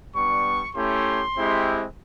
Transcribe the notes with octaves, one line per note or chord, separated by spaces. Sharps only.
G3 B3 D4 C#6
A3 C#4 E4 G4 C6
G#3 C4 E4 G4